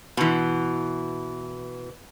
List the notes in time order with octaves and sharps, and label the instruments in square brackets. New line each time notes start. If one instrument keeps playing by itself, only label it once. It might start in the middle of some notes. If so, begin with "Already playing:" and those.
[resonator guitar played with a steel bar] B2 E3